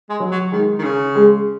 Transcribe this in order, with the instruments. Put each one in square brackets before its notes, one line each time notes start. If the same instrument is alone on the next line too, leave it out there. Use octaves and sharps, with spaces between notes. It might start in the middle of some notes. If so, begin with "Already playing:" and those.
[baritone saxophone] G#3
[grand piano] F#3
[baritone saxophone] F#3
[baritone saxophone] D#3 [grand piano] G#3
[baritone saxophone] D#3
C#3
[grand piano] G#3